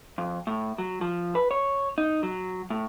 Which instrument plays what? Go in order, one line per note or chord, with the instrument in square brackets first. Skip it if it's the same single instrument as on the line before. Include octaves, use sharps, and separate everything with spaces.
[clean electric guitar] F2
A2
F#3
F3
B4
C#5
D#4
F#3
A2